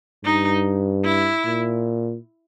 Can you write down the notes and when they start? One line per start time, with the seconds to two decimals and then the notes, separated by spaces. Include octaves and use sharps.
0.24 G2 D#4
1.04 E4
1.45 A#2